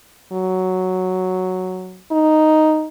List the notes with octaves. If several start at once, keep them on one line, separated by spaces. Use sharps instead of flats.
F#3
D#4